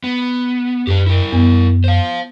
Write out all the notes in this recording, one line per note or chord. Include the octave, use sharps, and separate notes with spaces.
B3
F#2 G4 A#4 B4
E4 A#4
F#2 B3
C5 F5